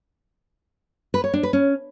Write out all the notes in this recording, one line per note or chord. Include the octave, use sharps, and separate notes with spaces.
B4
C#5
D4
B4
C#4